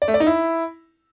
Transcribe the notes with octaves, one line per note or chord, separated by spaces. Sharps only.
D5
A3
D5
D#4
E4